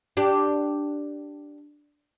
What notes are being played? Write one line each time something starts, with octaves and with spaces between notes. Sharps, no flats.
D4 G4